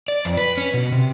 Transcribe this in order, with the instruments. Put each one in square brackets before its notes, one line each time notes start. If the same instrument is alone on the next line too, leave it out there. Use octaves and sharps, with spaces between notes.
[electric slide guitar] D5
F2
B4
C#4
B2
C3